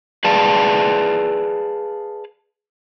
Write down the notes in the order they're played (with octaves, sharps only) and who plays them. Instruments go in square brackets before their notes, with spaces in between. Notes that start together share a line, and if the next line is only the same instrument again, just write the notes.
[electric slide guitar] G#4 B4 D5 F5 A5